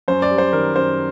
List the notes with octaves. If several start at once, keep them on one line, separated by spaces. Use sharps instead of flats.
F#2 C5
D5
G3
C5
D#3 A#4
F#2 C5